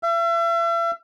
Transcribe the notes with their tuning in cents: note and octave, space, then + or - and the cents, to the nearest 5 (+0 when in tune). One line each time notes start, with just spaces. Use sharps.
E5 +40